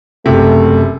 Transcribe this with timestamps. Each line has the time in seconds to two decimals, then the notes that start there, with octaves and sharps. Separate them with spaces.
0.26 F#1 C3 A3